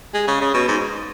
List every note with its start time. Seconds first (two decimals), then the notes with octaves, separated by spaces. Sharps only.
0.14 G#3
0.27 C#3
0.41 C#3
0.54 B2
0.68 G#2